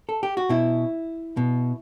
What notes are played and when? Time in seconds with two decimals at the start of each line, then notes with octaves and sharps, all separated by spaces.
0.09 A4
0.23 G4
0.37 F#4
0.49 B2 E4
1.37 B2